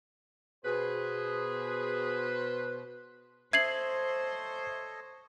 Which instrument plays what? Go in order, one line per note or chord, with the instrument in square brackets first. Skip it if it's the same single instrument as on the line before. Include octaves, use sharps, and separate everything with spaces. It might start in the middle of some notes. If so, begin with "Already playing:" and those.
[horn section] B2 B4 C5 [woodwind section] G#4
[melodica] A4 C#5 D#5 [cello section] C5 [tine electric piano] E5 [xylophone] G#6 C7 F#7